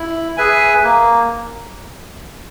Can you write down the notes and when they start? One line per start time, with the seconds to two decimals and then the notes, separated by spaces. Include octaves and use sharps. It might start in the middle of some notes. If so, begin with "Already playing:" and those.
Already playing: E4
0.37 G#4 B4 E5 G#5
0.84 A#3